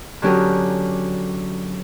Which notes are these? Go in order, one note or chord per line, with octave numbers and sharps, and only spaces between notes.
D3 F#3 C#4 G4 G#4 A#4